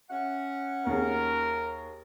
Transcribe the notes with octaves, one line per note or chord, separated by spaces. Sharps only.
C#4 E5 F#5
D#2 G#4 A#4